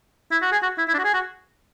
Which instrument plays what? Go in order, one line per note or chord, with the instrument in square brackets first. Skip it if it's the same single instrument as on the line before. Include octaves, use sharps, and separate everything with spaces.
[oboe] E4
F#4
G#4
F#4
E4
E4
D4
F#4
G#4
F#4